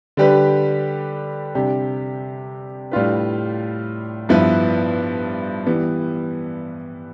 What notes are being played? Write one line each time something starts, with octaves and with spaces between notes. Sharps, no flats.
D3 G3 D4 G4 B4
C3 G3 D4 G4
A2 G3 D4 F4 B4
G2 F3 B3 E4 B4
E3 G3 B3